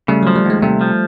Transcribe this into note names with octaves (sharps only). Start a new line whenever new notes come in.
C#3 G3 A3
F3 F#3
G3
D#2 G#3
C3 G3 A3
F3